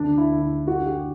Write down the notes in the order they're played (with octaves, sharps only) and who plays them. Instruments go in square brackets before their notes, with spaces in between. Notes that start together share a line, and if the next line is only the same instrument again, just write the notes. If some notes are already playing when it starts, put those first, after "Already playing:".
Already playing: [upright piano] D2 D4
E4
D2
E4
D3 F#4
G4